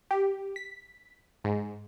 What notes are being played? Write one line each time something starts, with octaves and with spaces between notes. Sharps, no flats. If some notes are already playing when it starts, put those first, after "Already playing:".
G4
B6
G#2